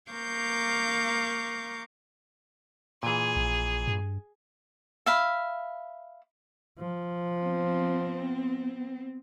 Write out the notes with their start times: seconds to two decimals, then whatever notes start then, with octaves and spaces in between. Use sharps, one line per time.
0.11 A#3 F5 A#5 C#6 D6 G6
3.03 A#2 E3 G#4
3.36 A#1
3.87 G2
5.06 E5 F5 B5
6.78 F3
7.42 B3 C4